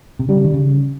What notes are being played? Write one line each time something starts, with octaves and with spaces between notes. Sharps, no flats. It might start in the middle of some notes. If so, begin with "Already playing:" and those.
C3
C#3 G3
D#3
C#3